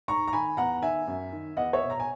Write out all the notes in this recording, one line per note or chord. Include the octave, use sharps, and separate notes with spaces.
G#2 A#5 C#6
A#5
D#3 G#5 B5
E2 F#5 A#5
D#3 E5 G#5
F#2
D#3
E2 D#5 F#5
C#5 E5
B2
A#5
G#5